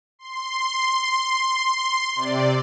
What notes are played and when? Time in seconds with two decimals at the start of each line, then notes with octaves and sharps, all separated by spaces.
0.19 C6
2.15 C3 D5